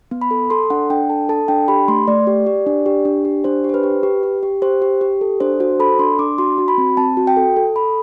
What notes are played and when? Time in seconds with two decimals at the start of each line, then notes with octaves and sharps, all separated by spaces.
0.11 B3
0.22 B5
0.31 A4
0.50 A4 C6
0.70 D4 F#5
0.90 D4 G5
1.10 A4 A5
1.29 A4 A5
1.48 D4 G5
1.68 G4 B5
1.88 A3 C6
2.07 A3 D5
2.27 G4
2.46 G4
2.67 D4
2.86 G4
3.05 D4
3.25 G4
3.44 D4 C5
3.64 G4
3.69 C5
3.74 B4
3.83 G4
4.03 G4
4.23 G4
4.43 G4
4.62 G4 C5
4.82 G4
5.01 G4
5.21 A4
5.40 D4 C5
5.60 F#4 C5
5.80 A4 B5
5.99 D4 C6
6.19 D4 D6
6.38 F#4 C6
6.58 F#4
6.68 B5
6.78 C4
6.97 C4 A5
7.17 F#4
7.27 G5
7.37 A4
7.57 A4
7.76 A4 B5